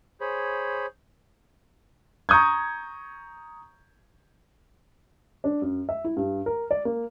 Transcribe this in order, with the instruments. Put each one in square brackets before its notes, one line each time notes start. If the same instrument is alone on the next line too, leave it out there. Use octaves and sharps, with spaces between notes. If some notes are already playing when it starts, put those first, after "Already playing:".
[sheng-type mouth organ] G#4 C5 C#5 B5
[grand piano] A#5 C#6 D#6 G6 G#6
[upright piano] D4
F#2
E5
E4
G2
A#4
D5
A#3